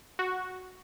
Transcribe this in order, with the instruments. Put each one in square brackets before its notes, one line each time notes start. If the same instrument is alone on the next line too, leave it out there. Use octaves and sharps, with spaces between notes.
[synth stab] F#4